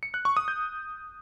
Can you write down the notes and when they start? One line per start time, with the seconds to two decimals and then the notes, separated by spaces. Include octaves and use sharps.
0.03 C#7
0.14 F#6
0.25 C#6
0.37 D#6
0.48 G6